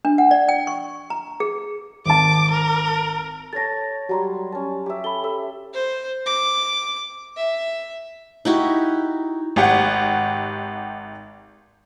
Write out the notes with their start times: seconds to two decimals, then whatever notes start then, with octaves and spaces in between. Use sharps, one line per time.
0.05 D4
0.18 F#5
0.31 D5
0.49 G5
0.67 C#6
1.10 A#5
1.40 G#4
2.06 G#1 A5 D6
2.51 A#4
3.53 A4 C#5 A5 A6 A#6
4.09 F#3 G3 G4 A#5 C6
4.52 C#4 A5
4.86 G4 E5
5.04 A4 B5 G7
5.24 A4 E5
5.74 C5
6.26 D6
7.36 E5
8.45 D#4 E4 F#4 G4
9.56 G#1 G4 F#5